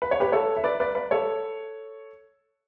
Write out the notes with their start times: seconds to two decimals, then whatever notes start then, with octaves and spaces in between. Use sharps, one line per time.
0.02 B4
0.11 C#5
0.20 G4 B4
0.32 A4 C#5
0.57 E5
0.64 B4 D5
0.80 B4 D5
0.95 B4 D5
1.11 A4 C#5